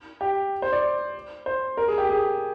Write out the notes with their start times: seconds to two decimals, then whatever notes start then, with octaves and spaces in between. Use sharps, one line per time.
0.21 G4
0.62 C5
0.72 D5
1.46 C5
1.77 A#4
1.88 G#4
1.98 G4
2.09 G#4